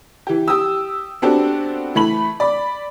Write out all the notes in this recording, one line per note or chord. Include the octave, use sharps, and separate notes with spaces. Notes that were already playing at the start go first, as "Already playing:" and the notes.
E3 G4
G4 D#6 E6
B3 C4 D4 F#4 G4 A4
E3 A3 B5 F#7
D5 B5